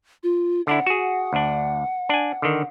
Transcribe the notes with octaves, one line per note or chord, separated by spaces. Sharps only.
F4
D3 D4 E4 F#5
F#4 G#4
D2 D4
D4 G#5
D3 D#3